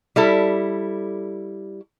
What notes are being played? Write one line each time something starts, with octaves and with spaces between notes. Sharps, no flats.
G3 E4 A4